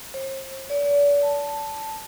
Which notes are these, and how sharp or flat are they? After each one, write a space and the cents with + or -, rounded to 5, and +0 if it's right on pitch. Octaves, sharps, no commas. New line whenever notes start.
C5 +40
D5 -40
A5 +0